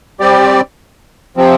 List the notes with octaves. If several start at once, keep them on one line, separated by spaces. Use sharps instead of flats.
G3 C4 G4 D5
C3 F3 C4